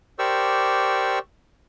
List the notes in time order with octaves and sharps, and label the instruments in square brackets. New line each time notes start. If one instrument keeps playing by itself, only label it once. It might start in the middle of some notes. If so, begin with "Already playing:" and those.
[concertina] G4 A#4 C5 D5 C#6 E6